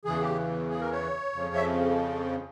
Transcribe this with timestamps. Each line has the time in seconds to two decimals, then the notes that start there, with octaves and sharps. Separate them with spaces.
0.05 E2 C#3 E3 G#4
0.21 G4
0.70 G#4
0.79 A#4
0.91 C#5
1.33 F2 C#3 F3
1.55 E5